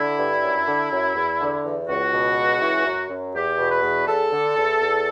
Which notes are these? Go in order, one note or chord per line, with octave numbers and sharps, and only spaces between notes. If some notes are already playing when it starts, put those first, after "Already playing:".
Already playing: D3 E4
G2
F#2
D3
F#2
E2
D3
E2
C#2 F#4
B2
C#2
E3
F#2
F#2
E2 G4
B2
B4
E2
E2 A4
D3
E2
E2